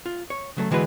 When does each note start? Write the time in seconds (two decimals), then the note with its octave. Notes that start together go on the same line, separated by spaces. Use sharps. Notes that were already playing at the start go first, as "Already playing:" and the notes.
0.06 F4
0.30 C#5
0.57 C#3 F#3 A3
0.71 D3 E3 G#3 F#4 B4